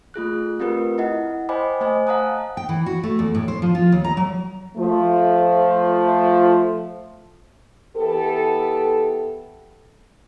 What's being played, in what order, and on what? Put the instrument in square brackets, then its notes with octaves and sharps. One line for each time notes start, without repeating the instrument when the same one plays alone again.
[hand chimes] A3 F4 G#4 F#6
A3 C4 F4 G4 A#4 B4
E4 D#5 F#5
C5 D#5 G5 G#5 B5 D6
A3 C5 D#5 G#5
F5 F#5 A5 A#5 D#6 F#6
[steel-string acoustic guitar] G5
E3
F#4
A3
E2
A2
C5
F3
F4
D#2
A#5
F#3
[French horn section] F3 A3
E3 B3 G4 A4